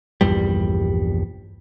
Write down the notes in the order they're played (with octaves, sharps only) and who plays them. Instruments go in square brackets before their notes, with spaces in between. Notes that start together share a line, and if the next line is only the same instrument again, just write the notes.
[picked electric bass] A#1 E2 G2 G3